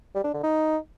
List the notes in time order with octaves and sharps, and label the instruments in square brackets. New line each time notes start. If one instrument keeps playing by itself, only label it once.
[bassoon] G3
D4
D3
D#4